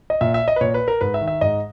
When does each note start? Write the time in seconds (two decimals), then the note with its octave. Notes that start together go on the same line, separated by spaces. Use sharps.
0.10 D#5
0.21 A#2 E5
0.34 E5
0.48 D#5
0.56 B4
0.61 A#2 C#5
0.74 B4
0.88 A#4
1.01 G#2 B4
1.14 E5
1.21 D#3
1.27 E5
1.41 G#2 D#5